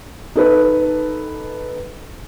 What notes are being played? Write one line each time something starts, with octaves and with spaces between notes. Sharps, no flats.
D#4 A4 B4